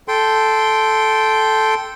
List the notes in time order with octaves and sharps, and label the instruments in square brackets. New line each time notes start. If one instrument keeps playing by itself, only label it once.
[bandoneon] A4 G5 C6